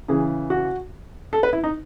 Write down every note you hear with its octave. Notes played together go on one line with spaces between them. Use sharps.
C#3 E3 G#4
F#4
A4
B4
E4
D#4